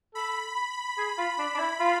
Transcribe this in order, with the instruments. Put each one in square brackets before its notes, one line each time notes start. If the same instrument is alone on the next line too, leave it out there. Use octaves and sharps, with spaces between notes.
[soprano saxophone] A4 [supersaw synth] B5
[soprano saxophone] G#4
F4
D4
D4
E4
F4